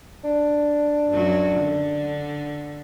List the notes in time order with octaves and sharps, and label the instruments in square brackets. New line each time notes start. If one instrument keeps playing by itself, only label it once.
[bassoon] D4
[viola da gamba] F#2 F#3
D3